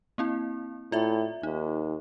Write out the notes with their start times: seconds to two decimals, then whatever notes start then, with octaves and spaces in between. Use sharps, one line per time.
0.18 A#3 C4 E4
0.92 A2 F4 D5 E5
1.43 D#2 D#4